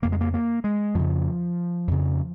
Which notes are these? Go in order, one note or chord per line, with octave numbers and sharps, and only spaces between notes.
F2 C#3 A#3
G#3
A#3
A#3
G#3
F2 C#3 F3
F2 C#3